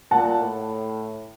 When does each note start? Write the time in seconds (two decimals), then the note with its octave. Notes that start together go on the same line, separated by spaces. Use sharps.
0.11 A#2 F#5 A5
0.39 A2